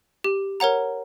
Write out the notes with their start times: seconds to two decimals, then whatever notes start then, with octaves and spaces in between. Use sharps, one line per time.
0.24 G4
0.60 A#4 C#5 F#5 A#5